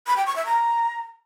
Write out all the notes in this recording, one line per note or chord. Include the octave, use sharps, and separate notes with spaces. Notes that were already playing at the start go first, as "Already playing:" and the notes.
B5
G5
C#6
E5
A#5